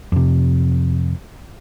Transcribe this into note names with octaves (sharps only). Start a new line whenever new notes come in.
F2 C3